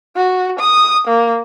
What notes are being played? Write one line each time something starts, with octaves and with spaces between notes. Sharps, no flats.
F#4
D#6
A#3